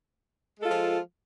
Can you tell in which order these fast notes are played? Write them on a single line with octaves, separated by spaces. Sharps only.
G#3 A4 F4 F3